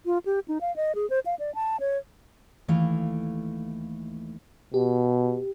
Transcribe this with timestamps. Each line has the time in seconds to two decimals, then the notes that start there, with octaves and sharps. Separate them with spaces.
0.06 F4
0.26 G4
0.48 D#4
0.61 F5
0.76 D#5
0.95 G#4
1.10 C5
1.26 F5
1.39 D5
1.55 A5
1.80 C#5
2.68 D#2 E3 A3 F5
4.74 B2 G4